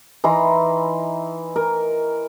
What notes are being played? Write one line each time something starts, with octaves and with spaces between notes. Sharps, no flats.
E3 D#4 A#5 C6
A#4